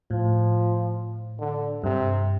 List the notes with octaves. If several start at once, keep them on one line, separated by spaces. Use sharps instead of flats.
A2 F3
D3
G2 C3